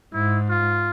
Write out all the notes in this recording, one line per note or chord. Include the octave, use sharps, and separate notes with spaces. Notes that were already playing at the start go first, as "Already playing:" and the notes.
G#2 E4
F4